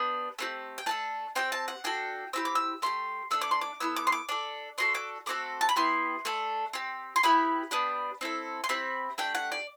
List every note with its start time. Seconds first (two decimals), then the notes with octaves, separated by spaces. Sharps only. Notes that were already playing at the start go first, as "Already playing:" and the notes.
Already playing: B3 D4 G4
0.39 A3 C4 G4
0.78 G5
0.86 A3 D4 A4 A5
1.35 C4 E4 G4 G5
1.52 A5
1.68 F#5
1.84 D4 F#4 A4 G5
2.33 C4 E4 G4 E6
2.45 D6
2.55 E6
2.82 A3 E4 G4 C6
3.31 A3 D4 A4 E6
3.41 D6
3.51 C6
3.61 D6
3.80 B3 E4 A4 E6
3.96 D6
4.07 C6
4.12 D6
4.29 D4 A4 D6
4.78 D4 F#4 A4 C6
4.95 D6
5.26 A3 C4 F#4 A4 D6
5.61 A5
5.69 B5
5.76 B3 E4 G4 C6
6.25 A3 D4 A4
6.73 C4 G4
7.16 C6
7.23 B3 E4 G4 B5
7.71 B3 D4 G4
8.21 C4 E4 A4
8.64 C6
8.69 C4 E4 G4 B5
9.18 A3 D4 G4 G5
9.35 F#5
9.52 D5